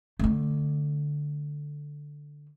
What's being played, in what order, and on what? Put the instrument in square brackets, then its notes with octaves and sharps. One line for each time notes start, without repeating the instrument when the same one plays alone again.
[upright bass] D3 A3